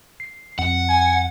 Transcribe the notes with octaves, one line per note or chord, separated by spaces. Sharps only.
C7
F2 F#5
G#5